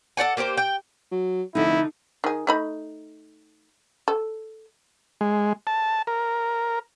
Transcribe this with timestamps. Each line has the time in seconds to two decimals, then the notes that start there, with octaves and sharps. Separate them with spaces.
0.17 A4 D5 F#5 G#5
0.37 A#3 G4 G#4 C5
0.57 G5
1.11 F#3
1.55 F1 D3 D#4 E4
2.24 D#3 G#4
2.47 A3 D#4 B5
4.08 A4
5.21 G#3
5.67 A5
6.07 A#4